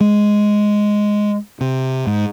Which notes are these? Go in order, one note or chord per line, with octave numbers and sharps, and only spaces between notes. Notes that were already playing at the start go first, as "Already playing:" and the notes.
G#3
C3
G#2